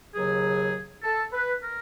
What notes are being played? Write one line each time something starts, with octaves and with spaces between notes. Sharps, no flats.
D#2 C#3 F#3 G#4
A4
B4
A#4